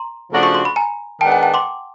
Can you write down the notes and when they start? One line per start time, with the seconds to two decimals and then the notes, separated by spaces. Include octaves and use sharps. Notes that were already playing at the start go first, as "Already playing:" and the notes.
Already playing: A#5 C6
0.31 C#3 F3 A3 D4 F#4
0.43 C#6
0.54 C6
0.65 B5
0.76 G#5 A#5
1.20 D#3 G#3 B3 D4 G5 A5
1.32 F#5 G#5
1.43 G5 A5
1.54 C6 D6